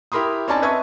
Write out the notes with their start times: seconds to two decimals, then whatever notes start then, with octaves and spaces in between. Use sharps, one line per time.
0.12 E4 G4 A#4 B5 C6 D#6
0.48 C4 C#4 D#4 D5 G#5 A5
0.62 B4 D#5 E5 C#6 G#6